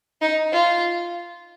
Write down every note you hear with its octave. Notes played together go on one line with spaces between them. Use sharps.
D#4
F4